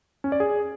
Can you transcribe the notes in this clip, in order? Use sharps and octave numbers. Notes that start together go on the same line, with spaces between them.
C#4
D5
G#4